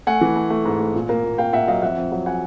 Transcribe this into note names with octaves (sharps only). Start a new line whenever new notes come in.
A3 F#5 G#5
E3
A3
A3
G#2
A3
A#2
A#3
A#2
A#3 F5 G5
A#2 E5 F#5
F#3 D#5 F5
F2 E5 F#5
F2
F#3
F#5 G#5